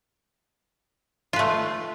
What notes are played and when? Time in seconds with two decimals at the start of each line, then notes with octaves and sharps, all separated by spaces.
1.33 F4
1.36 B4
1.39 A3